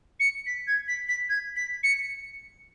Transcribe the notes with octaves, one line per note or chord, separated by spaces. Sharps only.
C#7
B6
G#6
B6
B6
G#6
B6
C#7